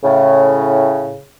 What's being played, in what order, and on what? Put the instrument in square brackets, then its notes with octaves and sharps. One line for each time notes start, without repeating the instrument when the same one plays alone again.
[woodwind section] A2 C#3